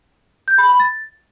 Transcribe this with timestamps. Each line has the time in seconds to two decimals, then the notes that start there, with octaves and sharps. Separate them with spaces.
0.48 G6
0.58 B5
0.69 B5
0.80 A6